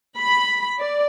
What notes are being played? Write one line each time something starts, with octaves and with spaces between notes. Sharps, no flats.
B5
D5